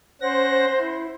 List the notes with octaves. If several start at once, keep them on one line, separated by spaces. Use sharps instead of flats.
C#4 C5 F#5 A#6
E4